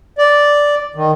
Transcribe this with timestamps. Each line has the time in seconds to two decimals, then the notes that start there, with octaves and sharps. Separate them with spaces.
0.18 D5
0.95 D#3